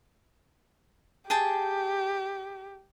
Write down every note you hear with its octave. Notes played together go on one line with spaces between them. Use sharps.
G4 G#4 G5 A5